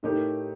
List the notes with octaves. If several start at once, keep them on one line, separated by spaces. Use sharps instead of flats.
A2 A3 D#4 G4 A#4